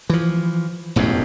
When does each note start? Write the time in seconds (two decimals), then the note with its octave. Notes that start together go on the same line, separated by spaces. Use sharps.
0.10 E3 F3
0.96 E1 A1 F#2 A2